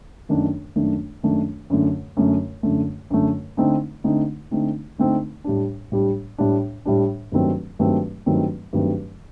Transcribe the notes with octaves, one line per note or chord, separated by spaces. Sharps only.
F#2 D#3 A3 D4
F#2 D#3 A3 D4
F#2 D#3 A3 D4
F#2 D3 A3
F#2 D3 A3
F#2 D3 A3
F#2 D3 A3
D3 A3 C4 D#4
D3 A3 C4 D#4
D3 A3 C4 D#4
D3 A3 C4 D#4
A2 G3 D4
A2 G3 D4
A2 G3 D4
A2 G3 D4
G2 D#3 F#3 A3 C4
G2 D#3 F#3 A3 C4
G2 D#3 F#3 A3 C4
G2 D#3 F#3 A3 C4